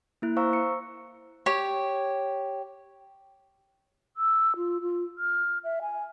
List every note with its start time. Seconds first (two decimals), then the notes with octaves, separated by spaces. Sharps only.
0.22 A#3 E4 F#6
0.37 C5 F5 A#5 C#6 E6
0.53 C#7
1.46 G4 C#5
4.17 E6
4.57 F4
4.82 F4
5.18 F6
5.64 E5
5.82 G#5